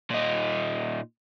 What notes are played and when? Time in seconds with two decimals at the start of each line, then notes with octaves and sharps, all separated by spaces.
0.10 A#2 D#4